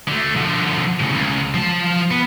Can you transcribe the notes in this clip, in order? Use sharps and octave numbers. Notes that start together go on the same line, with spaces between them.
D3 A3
D3 F3
A2 C#3
C#2
F3 A5
B3